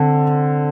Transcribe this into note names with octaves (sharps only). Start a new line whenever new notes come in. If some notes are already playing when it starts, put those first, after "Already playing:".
Already playing: D3 C4